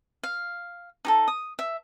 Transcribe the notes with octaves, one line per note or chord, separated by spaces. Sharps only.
F5
D#4 G4 A4
D#6
E5